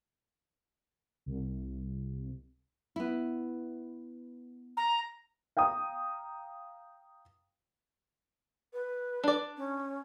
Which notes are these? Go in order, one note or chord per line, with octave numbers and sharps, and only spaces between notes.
C2
B3 E4
A#5
F5 G5 A#5 D#6
B4
D4 D5
C#4